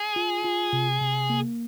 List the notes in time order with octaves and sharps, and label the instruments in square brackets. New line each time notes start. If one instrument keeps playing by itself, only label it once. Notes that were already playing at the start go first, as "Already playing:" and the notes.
Already playing: [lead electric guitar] G#4
[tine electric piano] F4
F4
C3
C3
A#3